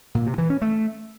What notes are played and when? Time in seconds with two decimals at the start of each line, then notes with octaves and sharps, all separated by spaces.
0.15 A#2
0.26 C3
0.38 E3
0.50 C#4
0.62 A3